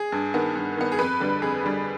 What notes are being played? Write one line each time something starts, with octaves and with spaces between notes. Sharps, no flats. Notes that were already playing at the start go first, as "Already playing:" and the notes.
Already playing: G#4
G2
D#3 B3
G2
D#3 B3
G#4
F2 B4
D3 G3
F2 G#4
D3 G3